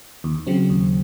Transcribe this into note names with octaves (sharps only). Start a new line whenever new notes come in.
D#2
C#3 F#3 C4
D#2